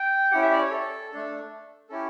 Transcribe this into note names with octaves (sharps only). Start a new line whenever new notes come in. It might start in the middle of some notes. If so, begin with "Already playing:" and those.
Already playing: G5
C#4 E4 G4 F#5
E5
D5
C#5
A4
A3 D4 A4
C#4 E4 G4 A4